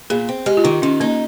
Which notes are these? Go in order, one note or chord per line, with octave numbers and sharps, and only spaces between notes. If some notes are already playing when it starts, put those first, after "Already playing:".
A#2 G#4
C4
G#3 G4
F4
D#3 D#4
D#3 C#4
A#3 D#4